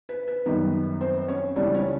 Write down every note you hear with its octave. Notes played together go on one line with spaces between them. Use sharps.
B4
B4
F#2 D#3 G3 B3 D#4
C4 C5
C#4 C#5
C#2 C#3 E3 G3 D4 D5
C#4 C#5